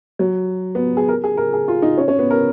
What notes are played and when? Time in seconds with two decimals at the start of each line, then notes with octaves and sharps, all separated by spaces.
0.19 F#3
0.75 B3
0.97 G#4
1.08 A#4
1.24 G#4
1.37 A#4
1.53 G#4
1.68 F4
1.82 D#4
1.98 C#4
2.08 C#4
2.19 B3
2.30 A#4